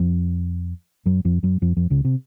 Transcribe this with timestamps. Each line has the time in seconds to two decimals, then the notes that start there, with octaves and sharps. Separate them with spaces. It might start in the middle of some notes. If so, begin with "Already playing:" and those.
Already playing: F2 F3
1.06 F#2 F#3
1.25 F2 F3
1.43 F#2 F#3
1.62 F2 F3
1.77 F2 F3
1.90 C#2 C#3
2.05 C3